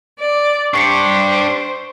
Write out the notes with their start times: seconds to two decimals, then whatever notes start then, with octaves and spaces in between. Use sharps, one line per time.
0.20 D5
0.74 D4 G4 C5 C#6 C7 C#7